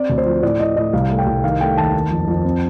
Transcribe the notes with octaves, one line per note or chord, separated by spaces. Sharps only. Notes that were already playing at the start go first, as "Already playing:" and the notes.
Already playing: C4 D5
D2
C5
F3
A2 D5
A2 D#5
A2 D#5
C2 F5
A3
G5
C2
D#3 F5
A3 G5
D#2 A5
D#3
F2
F2
C4